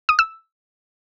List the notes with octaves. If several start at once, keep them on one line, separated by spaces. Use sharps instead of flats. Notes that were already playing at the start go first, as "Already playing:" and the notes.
D#6
E6